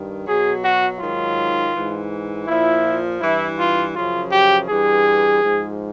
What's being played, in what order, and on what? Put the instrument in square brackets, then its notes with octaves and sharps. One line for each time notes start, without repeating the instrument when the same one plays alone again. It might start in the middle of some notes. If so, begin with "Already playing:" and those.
Already playing: [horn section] G2 D#3
B2 F#3 G#4
F#4
G#2 D#3 F#3 F4
G#2 E3
A#2 F3 E4
G2 E3 E4
F4
F#2 C#3 F3 F4
G4
G2 E3 G#4
G#2 F3